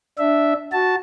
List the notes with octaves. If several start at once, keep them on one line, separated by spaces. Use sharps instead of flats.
D4 E5
F#4 A5